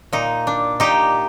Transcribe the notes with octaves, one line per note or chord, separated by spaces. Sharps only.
A#2 D#4
D4
A#2 D#4 G4